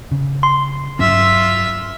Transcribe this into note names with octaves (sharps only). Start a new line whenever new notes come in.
C#3
C6
G2 F#3 C#4 F4 E5